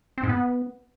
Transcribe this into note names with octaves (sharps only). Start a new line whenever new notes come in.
C4
G#2
B3